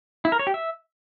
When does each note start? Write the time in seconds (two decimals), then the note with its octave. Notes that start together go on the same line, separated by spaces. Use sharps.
0.25 E4
0.32 A#4
0.39 C#5
0.47 G4
0.54 E5